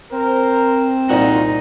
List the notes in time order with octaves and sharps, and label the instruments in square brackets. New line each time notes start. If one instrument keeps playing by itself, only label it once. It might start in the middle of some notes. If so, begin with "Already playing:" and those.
[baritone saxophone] C4 [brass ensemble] A#4 C5
[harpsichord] C2 A#2 F#5 [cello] D#4 [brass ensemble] F4 F#4